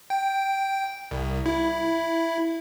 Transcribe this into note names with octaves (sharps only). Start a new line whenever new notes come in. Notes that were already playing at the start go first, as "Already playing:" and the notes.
G5
C2
E4